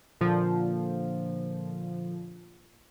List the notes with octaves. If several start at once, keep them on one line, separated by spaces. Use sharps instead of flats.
A#2 D3 F3